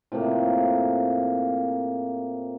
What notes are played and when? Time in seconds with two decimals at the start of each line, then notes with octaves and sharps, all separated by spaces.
0.12 A2 C3 F3 A#3